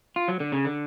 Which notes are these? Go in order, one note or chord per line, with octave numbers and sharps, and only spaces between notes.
F4
F#3
D3
C#3
D3